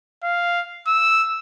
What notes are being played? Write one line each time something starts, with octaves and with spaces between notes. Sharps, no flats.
F5
E6